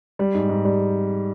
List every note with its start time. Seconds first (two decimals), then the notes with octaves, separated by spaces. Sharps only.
0.19 G3
0.34 G#2
0.49 G#2
0.65 G3